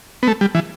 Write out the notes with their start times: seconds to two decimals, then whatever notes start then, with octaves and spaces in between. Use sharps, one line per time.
0.23 B3
0.27 A3
0.41 G3
0.55 E3